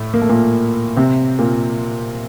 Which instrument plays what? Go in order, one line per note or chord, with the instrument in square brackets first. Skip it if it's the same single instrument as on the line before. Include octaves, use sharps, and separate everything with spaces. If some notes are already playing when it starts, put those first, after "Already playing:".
Already playing: [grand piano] A2 A3
A#3
A3
A#2 A#3
C3 C4
A#2 A#3